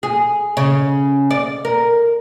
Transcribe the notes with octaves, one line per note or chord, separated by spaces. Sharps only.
G#4
C#3
D5
A#4